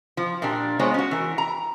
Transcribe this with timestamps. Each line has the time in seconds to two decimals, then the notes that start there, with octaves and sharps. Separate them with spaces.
0.17 F3
0.42 A#2 A#3 D4 G4
0.79 G#3 B3 F4 C5 C#5
0.94 C#4 F#4
1.11 E3 A#4
1.38 A#5